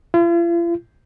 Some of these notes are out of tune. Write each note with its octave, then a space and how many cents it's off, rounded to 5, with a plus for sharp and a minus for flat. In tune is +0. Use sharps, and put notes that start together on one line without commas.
F4 -45